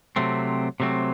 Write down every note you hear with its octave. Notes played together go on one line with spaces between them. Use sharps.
C3 F#3 A3 C4
C3 F#3 A3 C4